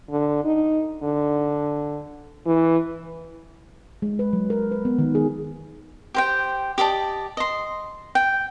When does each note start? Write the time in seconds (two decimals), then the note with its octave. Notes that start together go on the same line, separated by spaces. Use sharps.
0.11 D3
0.44 D#4
1.03 D3
2.46 E3
4.02 G#3
4.19 B4
4.33 F#3
4.50 A#4
4.71 B4
4.85 B3
4.99 D#3
5.15 G#4
6.14 G4 C5 G5
6.78 G4 D5 D#5 A5
7.37 D#5 C6
8.15 G5